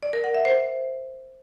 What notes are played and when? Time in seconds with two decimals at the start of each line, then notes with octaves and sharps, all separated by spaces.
0.03 D5
0.13 A#4
0.24 F#5
0.34 E5
0.45 C5